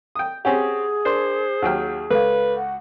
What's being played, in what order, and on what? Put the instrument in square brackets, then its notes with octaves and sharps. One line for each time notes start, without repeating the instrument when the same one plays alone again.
[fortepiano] G5 D#6
[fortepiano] C4 C#4 G4 [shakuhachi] G#4 [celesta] F#5 G#5
[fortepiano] D4 [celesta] A#4 C6 [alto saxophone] C5
[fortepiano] D#2 F#3 G5 [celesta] F#5 F6
[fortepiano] C#2 [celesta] A4 F5 [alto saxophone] B4
[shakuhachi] F#5